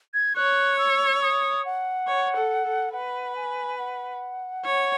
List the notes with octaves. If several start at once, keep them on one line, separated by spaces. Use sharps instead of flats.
G#6
C#5 F#6
E6
D#6
F#5
C#5
A4
A4
B4 F#5
G#5
F#5
C#5